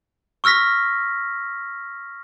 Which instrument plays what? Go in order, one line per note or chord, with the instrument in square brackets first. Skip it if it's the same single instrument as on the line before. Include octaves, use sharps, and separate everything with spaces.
[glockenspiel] C#6 E6 F6 A#6 B6